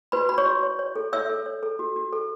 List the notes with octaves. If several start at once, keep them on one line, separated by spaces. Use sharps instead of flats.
F#4 B4 B5
F#4 B5
C#5 C#6
F#4
C#5
C#5
A4
C#5 E5 E6
A4
C#5
A4
F#4
F#4
A4